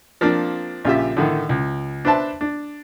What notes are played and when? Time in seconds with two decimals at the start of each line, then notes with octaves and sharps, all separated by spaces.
0.21 F3 A#3 C4 D4
0.85 A#1 C#3 F4 G4 E5
1.17 A2 D3 D#3
1.49 C#2
2.05 D4 B4 C5 E5 A5
2.41 D4